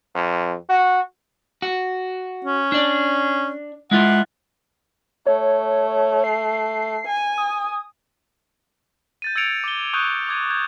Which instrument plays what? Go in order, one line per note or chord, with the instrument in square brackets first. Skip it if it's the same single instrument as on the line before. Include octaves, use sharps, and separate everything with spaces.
[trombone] F2
F#4
[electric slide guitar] F#4
[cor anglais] C#4
[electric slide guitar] D4 D5
[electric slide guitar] G#3 E4 F4 [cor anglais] F#5
[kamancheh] A3 [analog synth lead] C#5
[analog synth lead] C7
[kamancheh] G#5
[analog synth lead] D#6
[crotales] G6 A6 D#7
E6 G#6 A6 C#7 D7 F7
D6 G7
C#6 D#6 F#6 G6 D#7 F7
D6 G#6 D7 D#7
G6 G#6